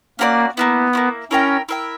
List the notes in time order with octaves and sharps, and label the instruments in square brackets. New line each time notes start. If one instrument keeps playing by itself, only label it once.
[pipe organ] A#3 [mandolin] C#4 F#4 A#4 D5
[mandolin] A#3 C#4 E4 [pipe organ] B3
[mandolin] A#3 C#4 E4
[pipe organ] C#4 [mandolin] E4 A#4 E5 G5
[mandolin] E4 A#4 E5 G5